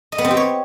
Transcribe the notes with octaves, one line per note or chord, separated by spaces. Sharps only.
D#5
B3
C4
G4
C#5